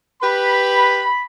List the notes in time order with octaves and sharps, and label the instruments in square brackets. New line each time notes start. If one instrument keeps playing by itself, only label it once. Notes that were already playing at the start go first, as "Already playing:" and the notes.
[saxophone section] G4 B4 [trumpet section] B5